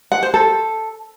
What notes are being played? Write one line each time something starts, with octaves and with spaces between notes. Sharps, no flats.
F#5
C5
A4